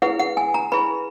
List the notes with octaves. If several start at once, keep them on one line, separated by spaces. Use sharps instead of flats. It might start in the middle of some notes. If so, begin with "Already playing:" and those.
E4 G#4 B4 F#5
F#5
G#5
A#5
E4 G#4 B4 B5